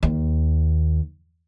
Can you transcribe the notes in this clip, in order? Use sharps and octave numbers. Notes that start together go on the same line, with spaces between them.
D#2